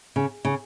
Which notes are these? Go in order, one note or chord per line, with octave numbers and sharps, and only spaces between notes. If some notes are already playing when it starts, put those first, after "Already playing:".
C#3
C#3